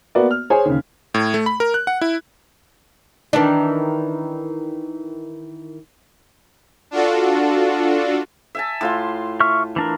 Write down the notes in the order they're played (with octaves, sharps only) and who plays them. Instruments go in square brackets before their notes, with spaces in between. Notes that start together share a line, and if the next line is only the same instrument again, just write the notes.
[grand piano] A#3 B3 F#4 D5
F6
G#4 C5 C#5 G#5
D#2 C#3
[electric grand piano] A2
A3
B5
A#4
F#6
F#5
E4
[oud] D#3 E3 D4
[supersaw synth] D4 F4 F#4 A4
[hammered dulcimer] E5 G#5 A5
A2 F4 C6
[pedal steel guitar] E5 C#6 F6
E3 D4 A#4